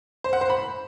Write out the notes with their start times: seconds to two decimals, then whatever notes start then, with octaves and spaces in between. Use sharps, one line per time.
0.24 C5
0.33 F#5
0.41 C5
0.50 B5